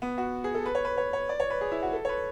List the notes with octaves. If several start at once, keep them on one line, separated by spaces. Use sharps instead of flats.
B3
F#4
G#4
A4
B4
C#5
B4
C#5
C#5
D5
C#5
B4
G#4
E4
F#4
A4
C#5
B4